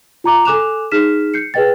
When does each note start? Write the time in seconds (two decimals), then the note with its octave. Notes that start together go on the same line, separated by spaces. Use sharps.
0.24 F4 A#5 D6
0.45 A4 G#5 D6 F#6 E7 F7
0.92 D#4 G#4 F6 B6 E7
1.34 G6 C7 C#7
1.54 G#4 B4 D#5 G5 A6